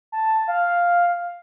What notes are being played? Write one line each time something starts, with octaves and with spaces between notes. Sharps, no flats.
A5
F5